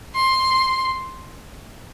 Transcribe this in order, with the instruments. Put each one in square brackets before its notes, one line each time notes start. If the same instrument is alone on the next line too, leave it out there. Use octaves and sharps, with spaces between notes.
[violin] C6